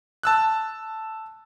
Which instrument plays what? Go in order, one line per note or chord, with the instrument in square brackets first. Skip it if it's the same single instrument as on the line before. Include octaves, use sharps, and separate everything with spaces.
[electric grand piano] A5 E6 F#6